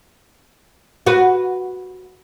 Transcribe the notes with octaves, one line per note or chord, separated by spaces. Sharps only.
F#4 B4